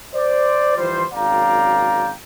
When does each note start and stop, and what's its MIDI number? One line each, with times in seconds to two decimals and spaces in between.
0.15 0.76 72
0.15 0.76 74
0.76 1.05 52
0.76 1.05 53
0.76 1.05 55
0.76 1.05 72
1.13 2.12 32
1.13 2.12 42
1.13 2.12 74
1.13 2.12 77
1.13 2.12 79
1.13 2.12 82